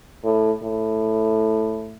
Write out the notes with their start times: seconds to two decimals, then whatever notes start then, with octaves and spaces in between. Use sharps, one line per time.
0.24 A2
0.62 A2